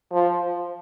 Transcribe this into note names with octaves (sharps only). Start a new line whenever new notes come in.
F3